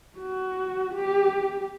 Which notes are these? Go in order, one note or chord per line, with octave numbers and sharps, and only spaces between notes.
F#4
G4